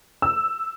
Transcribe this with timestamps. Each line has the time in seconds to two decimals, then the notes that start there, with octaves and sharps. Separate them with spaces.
0.22 E6